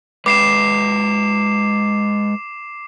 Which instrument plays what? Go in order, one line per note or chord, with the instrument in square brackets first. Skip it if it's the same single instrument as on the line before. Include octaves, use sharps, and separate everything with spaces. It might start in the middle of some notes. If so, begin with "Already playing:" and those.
[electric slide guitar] G#3 B4 [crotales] D6 C7 E7